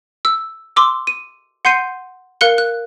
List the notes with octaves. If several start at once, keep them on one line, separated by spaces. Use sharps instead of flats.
E6
C6 D6 E6
D#7
F#5 C6 G6 C7 D#7
A#4 F5 F#6 C#7 G7
F#6